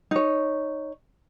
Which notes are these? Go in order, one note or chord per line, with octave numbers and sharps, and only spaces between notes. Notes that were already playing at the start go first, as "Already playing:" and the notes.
D#4 C#5